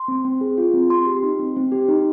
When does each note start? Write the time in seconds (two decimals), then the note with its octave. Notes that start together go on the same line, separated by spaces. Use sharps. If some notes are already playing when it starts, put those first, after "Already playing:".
Already playing: C6
0.08 C4
0.25 C4
0.41 G#4
0.58 F4
0.74 C4
0.90 C4 C6
1.07 G4
1.23 D#4
1.39 C4
1.56 C4
1.72 G4
1.89 D#4